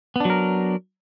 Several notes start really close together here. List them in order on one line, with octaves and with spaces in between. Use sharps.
B3 D4 F#3 A#4